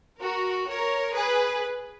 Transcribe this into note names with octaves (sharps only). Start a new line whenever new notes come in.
F#4 A#4
A#4 C#5
G#4 B4